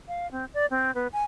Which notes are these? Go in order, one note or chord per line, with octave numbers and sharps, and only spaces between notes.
F5
C4
D5
C4
B3
G#5